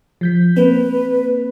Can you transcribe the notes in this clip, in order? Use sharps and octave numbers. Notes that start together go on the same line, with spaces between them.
F3 G6 B6
A#3 C4 B4